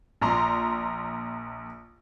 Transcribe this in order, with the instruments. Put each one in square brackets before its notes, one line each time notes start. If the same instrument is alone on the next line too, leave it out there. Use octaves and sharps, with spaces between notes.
[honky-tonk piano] A#1 A#5 C6